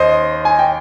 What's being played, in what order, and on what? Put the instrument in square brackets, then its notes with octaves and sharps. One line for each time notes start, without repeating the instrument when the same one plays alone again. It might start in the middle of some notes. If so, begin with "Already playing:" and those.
Already playing: [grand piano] D#2 C#4 C5 D#5
G#5
G5